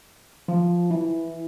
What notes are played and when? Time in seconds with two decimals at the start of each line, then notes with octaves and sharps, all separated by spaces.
0.48 F3
0.91 E3